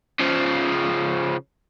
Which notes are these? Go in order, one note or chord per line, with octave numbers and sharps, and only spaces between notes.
C#3 F3